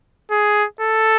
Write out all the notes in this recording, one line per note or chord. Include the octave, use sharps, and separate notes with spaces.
G#4
A4